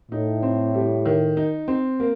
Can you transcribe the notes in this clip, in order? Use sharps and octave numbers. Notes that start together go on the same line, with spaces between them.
A2 D#4
C4
G3
D#3
D#4
C4
A#3